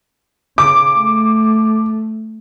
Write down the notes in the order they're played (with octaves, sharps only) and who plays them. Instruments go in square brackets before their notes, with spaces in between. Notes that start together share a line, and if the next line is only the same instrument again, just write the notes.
[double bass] C#3 [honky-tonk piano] D6
[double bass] A3